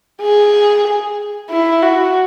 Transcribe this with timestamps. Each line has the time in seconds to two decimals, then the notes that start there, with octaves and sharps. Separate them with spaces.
0.22 G#4
1.50 E4
1.83 F#4